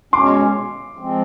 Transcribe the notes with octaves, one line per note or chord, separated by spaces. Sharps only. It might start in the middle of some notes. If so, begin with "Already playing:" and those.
B2 G#3 C#4 C6 D6
F3 G#3 C4